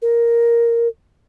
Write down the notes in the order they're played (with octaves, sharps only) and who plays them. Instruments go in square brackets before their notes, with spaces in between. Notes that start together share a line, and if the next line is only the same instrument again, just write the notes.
[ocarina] A#4